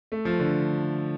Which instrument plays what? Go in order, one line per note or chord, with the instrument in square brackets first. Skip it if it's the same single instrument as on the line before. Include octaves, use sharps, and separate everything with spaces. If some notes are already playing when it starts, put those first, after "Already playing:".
[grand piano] A3
F3
D3